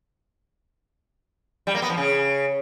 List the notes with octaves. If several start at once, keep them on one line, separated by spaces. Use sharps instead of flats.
G3
A#3
B3
F3
C#3